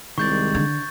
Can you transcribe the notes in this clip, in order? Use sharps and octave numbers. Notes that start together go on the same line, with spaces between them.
C2 D#3 G#3 D5 C#6 G6 A6
D3 G#6